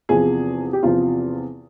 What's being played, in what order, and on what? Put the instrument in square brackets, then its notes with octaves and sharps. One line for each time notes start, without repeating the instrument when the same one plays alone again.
[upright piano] E2 C3 F3 G#4
G4
E2 C3 F3 F4